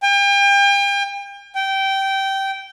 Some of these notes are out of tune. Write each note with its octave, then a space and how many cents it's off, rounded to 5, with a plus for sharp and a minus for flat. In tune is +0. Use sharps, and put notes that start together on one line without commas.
G5 +40
G5 -15